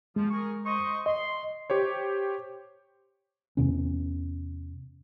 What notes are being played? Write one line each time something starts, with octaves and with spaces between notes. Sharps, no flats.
F3 G#3
G#4 A#4 C#6
C5 D#5 C#6
D#5 C6
G4 C5 C#5
E2 C3 C#4